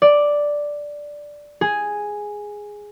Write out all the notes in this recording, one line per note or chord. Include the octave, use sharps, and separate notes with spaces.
D5
G#4